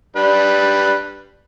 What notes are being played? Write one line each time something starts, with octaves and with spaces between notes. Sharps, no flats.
G3 D4 B4